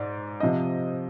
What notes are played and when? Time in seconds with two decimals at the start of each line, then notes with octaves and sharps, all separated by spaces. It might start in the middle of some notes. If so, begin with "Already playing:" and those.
Already playing: G#2 D5
0.40 C3 F3 D#5